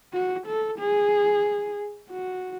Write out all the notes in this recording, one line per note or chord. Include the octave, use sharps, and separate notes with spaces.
F#4
A4
G#4
F#4